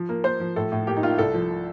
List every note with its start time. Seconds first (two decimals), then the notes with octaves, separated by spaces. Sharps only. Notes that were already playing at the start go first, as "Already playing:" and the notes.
Already playing: F3
0.09 A#3
0.24 A#3 C5
0.40 F3
0.56 A2 A4
0.72 A2
0.87 A#3 G4
0.97 D#4
1.03 A#3 F4
1.18 C2 A4
1.34 F3